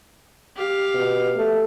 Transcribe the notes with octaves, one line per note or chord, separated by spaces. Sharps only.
G4 F5
B2
A3